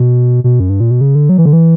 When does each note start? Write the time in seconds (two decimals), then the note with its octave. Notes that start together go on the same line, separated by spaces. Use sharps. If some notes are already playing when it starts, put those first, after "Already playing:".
Already playing: B2
0.44 B2
0.60 F#2
0.69 G2
0.80 A#2
0.91 B2
1.01 C#3
1.15 D3
1.29 F#3
1.38 E3
1.45 D3
1.53 E3